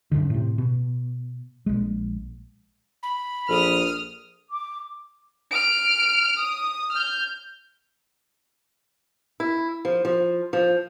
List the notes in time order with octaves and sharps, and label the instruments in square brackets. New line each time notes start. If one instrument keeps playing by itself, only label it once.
[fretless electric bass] F#2 A2 D3 D#3
A2 C3
B2
A#1 G#3
[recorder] B5
[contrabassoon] A#1 [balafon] A4 [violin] D#6 F6
[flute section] D6
[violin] F6 D7
D#6
F6 G6
[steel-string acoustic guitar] E4
F3
F3
F3